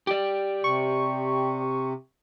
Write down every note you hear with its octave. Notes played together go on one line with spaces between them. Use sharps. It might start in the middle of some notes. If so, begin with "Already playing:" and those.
G4 D5
C3 C#6